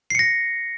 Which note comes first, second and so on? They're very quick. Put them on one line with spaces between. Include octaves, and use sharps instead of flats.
C7 C#7 A#6